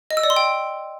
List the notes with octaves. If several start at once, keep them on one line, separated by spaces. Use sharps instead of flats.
D#5
E6
D5
C6
G5